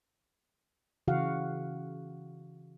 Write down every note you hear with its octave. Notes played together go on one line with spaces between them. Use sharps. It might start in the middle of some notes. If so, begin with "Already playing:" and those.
C#3 E3 F#4 F5 F#5